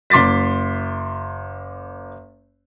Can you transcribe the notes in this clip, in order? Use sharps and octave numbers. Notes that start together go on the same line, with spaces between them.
F#1 C6 D6 A6 B6